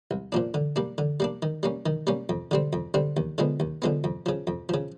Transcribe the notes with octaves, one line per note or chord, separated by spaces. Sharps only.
C2
A#2 F3 A#3 D4
D3
G3 A#3 D4
D3
G3 A#3 D4
D#3
G3 A#3 C#4
D#3
G3 A#3 C#4
F2
D3 G3 C4
F2
D3 G3 C4
D#2
D3 F3 G#3 B3
D#2
D3 F3 G#3 B3
F2
C#3 F3
F2
C#3 F3